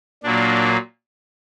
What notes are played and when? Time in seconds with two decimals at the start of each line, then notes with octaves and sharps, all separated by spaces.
0.23 A#2 F#3 A#3 D4